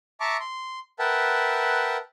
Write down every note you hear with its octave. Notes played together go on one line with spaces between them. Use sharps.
E5 A5 A#5 C#6 D6
C6
A#4 B4 E5 F#5 G5 A5